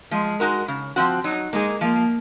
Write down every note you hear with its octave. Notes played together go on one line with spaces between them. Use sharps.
F3 G#3
G#3 D#4 F#4 A#4
C#3
F3 C4 F#4
F#3 D#4
G#3 A#3 D#4 G#4
F3 A#3